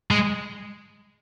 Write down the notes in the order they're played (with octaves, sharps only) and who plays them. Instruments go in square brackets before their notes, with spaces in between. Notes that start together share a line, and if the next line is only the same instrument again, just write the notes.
[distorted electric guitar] G#3